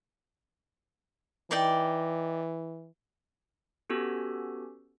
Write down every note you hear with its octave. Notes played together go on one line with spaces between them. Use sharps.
E3 D#4 D5 G5
B3 C#4 F#4 G4 A4